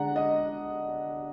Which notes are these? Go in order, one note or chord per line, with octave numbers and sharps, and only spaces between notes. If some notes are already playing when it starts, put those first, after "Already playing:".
Already playing: D3 G#3 D4 F#5 A#5
D#5